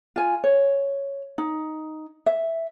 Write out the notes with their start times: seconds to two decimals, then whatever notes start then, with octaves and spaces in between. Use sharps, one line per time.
0.16 F4 G#5
0.44 C#5
1.38 D#4
2.26 E5